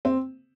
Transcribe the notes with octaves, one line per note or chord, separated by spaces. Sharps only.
C4